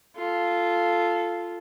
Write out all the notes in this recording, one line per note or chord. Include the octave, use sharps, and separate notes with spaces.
F4 A4